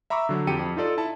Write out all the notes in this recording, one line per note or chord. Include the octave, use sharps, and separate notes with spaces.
E5 A#5 B5 C#6 D6 E6
D3 F#3
F2 G4 G5 C#7 D#7
F2
D#4 F4 A4 D5
E4 A5